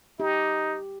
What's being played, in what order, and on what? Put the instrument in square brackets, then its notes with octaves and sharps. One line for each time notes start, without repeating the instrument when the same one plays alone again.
[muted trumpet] D#4 [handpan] G4